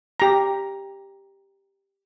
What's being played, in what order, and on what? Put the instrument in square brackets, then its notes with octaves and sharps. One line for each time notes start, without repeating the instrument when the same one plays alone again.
[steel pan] G4 A#5